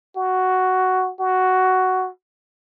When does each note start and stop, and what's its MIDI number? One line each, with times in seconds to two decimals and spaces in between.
0.16 1.12 66
1.20 2.09 66